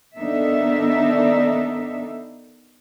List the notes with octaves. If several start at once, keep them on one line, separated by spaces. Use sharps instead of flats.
D#3 B3 D4 D#4 A4 E5